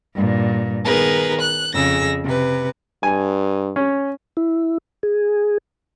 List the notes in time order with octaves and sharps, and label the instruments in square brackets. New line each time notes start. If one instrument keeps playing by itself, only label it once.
[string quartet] G2 A#2
D#3 B3 G#4 A#4 B4
F#6
F2 C#3 G#4 E6 A#6
C3 B4
[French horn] G2 [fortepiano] G#5
[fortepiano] C#4
[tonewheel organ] E4
G#4